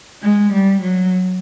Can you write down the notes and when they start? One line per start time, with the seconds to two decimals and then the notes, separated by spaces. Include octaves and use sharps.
0.23 G#3
0.53 G3
0.82 F#3